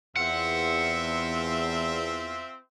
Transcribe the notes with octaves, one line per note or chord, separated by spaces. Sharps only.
E2 C4 F4 E5 F#5